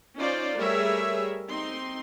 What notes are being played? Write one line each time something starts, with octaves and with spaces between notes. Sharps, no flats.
C#4 D#4 F4 C5 D5
G3 A3 G#4 A#4 C#5 E5
C4 D#4 C6